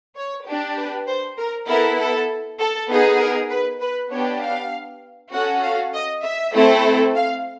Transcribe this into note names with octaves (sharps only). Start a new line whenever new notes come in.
C#5
D4 G4
B4
C5
A#4
B3 E4 A4 A#4
A4
A4
B3 D#4 G#4
A#4
B4
B4
B3 D4 G4 C#5
F5
C#4 F#4 A4 F#5
F5
D#5
E5
A3 C4 E4 A4
F5